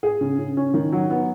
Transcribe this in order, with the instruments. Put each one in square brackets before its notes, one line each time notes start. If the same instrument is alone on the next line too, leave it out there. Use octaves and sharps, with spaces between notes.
[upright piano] G#4
C#3
C#3
C#4
D#3
F#3
B3